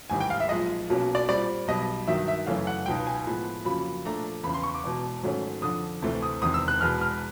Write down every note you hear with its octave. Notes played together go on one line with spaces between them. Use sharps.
A1 G#2 D#3 G3 G#5
G5
F5
E5
B1 A#2 F3 G#3 D#5
B1 B2 F#3 A#3 C#4
D5
A#2 G3 C4 D5
B1 B2 G3 D#5
G2 D#3 F#3 E5
E5
F#2 C#3 E3 A3 C#4 F5
F#5
C#2 B2 F#3 B3 D#4 G5
G#5
A2 F3 G#3 B3
F2 C#3 F#3 A#3 B5
A#2 F3 A3 D4 A#5
E2 C#3 E3 B5
C6
C#6
D6
E1 E2 B2
G#2 D#3 F#3 A3 C#4
F2 D3 F3 D#6
D2 C3 E3 A3 C4
D#6
E1 E2 C3 D#3 D#6
E6
F#6
E1 E2 B2 G#3 B3 F6
F6